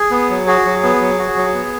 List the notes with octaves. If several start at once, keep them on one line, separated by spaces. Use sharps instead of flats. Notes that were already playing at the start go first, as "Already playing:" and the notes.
Already playing: G#4
B3
F#3
F#4 G#4
F#3
B3
F#3
F#4
F#3
B3